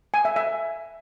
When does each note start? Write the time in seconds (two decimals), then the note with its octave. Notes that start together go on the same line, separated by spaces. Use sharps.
0.14 G#5
0.25 E5
0.36 E5